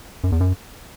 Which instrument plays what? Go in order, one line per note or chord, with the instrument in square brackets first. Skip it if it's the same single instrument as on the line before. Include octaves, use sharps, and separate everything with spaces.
[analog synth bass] F#2
E2
F#2